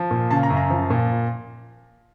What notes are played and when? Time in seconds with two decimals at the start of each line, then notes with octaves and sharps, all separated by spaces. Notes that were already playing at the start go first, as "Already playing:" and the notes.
Already playing: F3
0.11 A#2
0.31 C#3 A5
0.43 A#5
0.50 F#2
0.57 A#5
0.70 F3
0.90 A#2